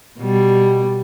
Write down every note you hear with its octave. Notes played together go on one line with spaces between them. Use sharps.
B2 G3